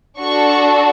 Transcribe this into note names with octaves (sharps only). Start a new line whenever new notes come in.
D4 F#4 A4 C#6